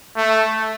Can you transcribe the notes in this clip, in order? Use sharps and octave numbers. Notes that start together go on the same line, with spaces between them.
A3